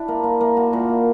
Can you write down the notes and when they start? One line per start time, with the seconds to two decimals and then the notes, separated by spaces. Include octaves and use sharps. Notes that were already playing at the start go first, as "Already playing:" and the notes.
Already playing: D4 E4
0.08 A#3
0.24 A#3
0.41 A#3
0.57 A#3 F#4
0.73 A#2
0.89 A#3